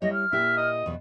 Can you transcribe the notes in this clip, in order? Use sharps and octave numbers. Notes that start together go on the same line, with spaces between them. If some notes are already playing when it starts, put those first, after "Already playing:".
G3 E4 C#5 D#5
F6
A#2 E4 G4 E5
D#5
E2 B2